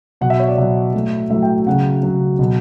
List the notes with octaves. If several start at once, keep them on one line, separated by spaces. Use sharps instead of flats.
B2 F#3 F#5
E5
C#5
D5
B2 F#3 E5
A2 F#3
A2 F#3 E5
G5
C#3 F#3 F#5
C#3 F#3
B2 F#3